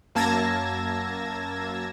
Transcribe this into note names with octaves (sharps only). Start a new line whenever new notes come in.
F#2 A#3 A5 E6 G#6 A#6